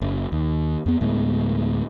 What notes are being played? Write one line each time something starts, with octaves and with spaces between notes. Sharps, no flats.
F#1
D#2
F2 B3
D2 A2 G#3 B3